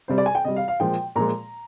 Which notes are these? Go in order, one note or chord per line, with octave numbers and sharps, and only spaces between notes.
C3 G3 C5
D5
G#5
G5
C3 G3 D#5
F5
F5
A#2 F3 G#3 G5
A#2 F3 G#3 A#5